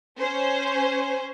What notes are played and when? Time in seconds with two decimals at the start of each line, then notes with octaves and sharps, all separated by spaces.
0.19 C#4 C5